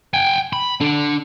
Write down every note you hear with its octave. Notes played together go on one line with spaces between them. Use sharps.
G5 G#5
B5
D4 A4